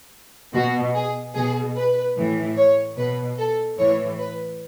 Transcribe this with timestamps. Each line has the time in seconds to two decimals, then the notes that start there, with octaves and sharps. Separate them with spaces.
0.54 B2 F#4
0.94 G#4
1.35 B2 G#4
1.76 B4
2.16 A2 E3
2.57 C#5
2.97 B2 B4
3.38 A4
3.78 A2 E3 C#5
4.18 B4